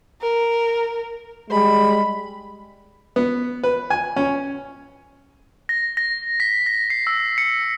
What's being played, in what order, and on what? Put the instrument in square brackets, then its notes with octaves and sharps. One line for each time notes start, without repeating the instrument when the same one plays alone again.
[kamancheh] A#4
[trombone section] G3 G#3 [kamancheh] B5
[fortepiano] B3
B4
G#5
C#4
[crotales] A#6
A#6
B6
A#6
C7
E6
C#7